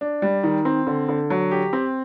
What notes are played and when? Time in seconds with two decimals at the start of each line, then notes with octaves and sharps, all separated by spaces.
0.01 D4
0.22 G3
0.43 D#3
0.65 C4
0.87 D3
1.09 D3
1.30 F#3
1.51 G4
1.73 C4